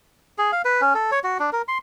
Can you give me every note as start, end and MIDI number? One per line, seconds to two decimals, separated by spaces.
0.38 0.51 68
0.52 0.62 77
0.65 0.81 71
0.81 0.94 61
0.95 1.11 69
1.12 1.19 73
1.24 1.38 66
1.39 1.50 62
1.53 1.62 70
1.68 1.78 84